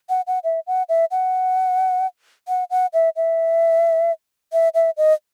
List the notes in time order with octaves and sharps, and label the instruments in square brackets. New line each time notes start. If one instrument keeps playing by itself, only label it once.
[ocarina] F#5
F#5
E5
F#5
E5
F#5
F#5
F#5
E5
E5
E5
E5
D#5